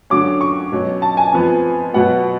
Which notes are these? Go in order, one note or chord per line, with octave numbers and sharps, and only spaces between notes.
D3 F#3 C#4 D6
C#6
B2 F#3 C#4
A5
G#5
F2 F3 B3
B2 F#3 B3 F#5